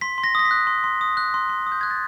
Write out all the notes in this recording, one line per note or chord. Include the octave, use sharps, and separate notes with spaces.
C6 B6
C6
A#6
D#6 A#6
B6
F#6
C6
C6
D#6
F#6
C6
C6
D#6
G6
F#6 G#6
A6